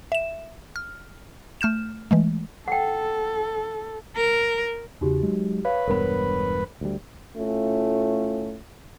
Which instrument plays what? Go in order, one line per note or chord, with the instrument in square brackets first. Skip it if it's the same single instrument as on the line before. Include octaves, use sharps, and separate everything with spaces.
[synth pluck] E5 E7
F6
A3 F6 G6 E7
E3 G#3 A3
[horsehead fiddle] A4 [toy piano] F#5 G5
[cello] A#4
[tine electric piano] E2 C#3 [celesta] D#4 F#4 G4
[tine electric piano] F#3 G#3
[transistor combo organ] B4 [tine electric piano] C#5 [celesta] F5
[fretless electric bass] E1 G2 B3 [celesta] A#4 C5 B5
[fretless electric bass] D2 G3
[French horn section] A2 A3 C#4 F4